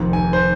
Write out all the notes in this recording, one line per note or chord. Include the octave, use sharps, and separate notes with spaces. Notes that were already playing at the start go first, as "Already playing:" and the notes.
Already playing: F1 F2 D#3
G#5
C5